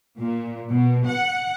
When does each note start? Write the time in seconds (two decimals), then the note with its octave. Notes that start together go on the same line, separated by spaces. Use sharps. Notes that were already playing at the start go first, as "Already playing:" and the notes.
0.20 A#2
0.70 B2
1.07 F#5